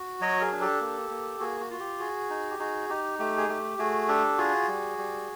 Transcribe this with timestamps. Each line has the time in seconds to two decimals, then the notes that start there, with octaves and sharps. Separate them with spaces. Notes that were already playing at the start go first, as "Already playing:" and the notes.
Already playing: F#4
0.21 F#3 C#5 D#5
0.41 G#4 A#4
0.52 D4
0.61 G4 A4
0.81 A#3
1.11 A#3
1.40 A#3 F#4 G#4
1.60 F#4
1.71 F4 F#4
1.80 G4
2.00 F#4 G#4
2.30 D#4
2.51 G4
2.59 D#4 F#4 G#4
2.90 D#4 G4
3.19 A3 G4
3.38 G#4
3.49 A3 G4
3.79 A3 F#4 G#4
4.08 D4 G4 A4
4.38 F4 F#4 G#4
4.68 G3
4.98 G3